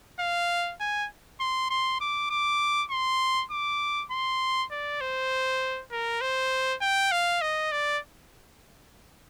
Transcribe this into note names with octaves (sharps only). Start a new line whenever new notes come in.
F5
G#5
C6
C6
D6
D6
C6
D6
C6
D5
C5
A#4
C5
G5
F5
D#5
D5